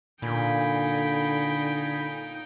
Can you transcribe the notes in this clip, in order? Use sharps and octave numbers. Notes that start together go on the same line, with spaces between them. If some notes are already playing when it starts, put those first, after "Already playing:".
A#2 D3 D#4 G5 G#5 B5